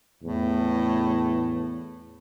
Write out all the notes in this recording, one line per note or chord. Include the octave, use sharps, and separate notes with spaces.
E2 A2